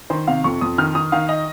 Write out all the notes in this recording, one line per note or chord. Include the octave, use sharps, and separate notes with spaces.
D#3 C5
C3 F5
F2 C#6
F2 D#6
D#3 F6
D#3 D#6
D#3 F5
D#5